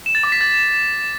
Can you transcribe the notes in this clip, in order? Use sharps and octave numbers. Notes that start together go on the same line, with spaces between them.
E7
A6
D6
B6
A6